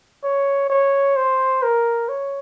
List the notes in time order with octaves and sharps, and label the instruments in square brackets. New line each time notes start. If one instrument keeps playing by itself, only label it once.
[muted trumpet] C#5
C#5
C5
A#4
C#5